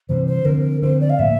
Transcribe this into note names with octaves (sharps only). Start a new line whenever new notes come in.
C3 E3 G3 C5
C5
D3 F3 C4 A#4
D3 F3 C4 C5
D5
F5
A2 F3 A#3 E5